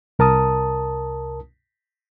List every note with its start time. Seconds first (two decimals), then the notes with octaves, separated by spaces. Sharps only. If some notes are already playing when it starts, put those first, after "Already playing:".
0.19 C2 A#4 A5 D#6